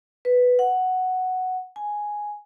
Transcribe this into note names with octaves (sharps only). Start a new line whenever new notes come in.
B4
F#5
G#5